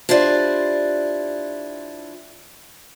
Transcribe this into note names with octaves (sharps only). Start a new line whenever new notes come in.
D4 E4 F4 G4 C5 D5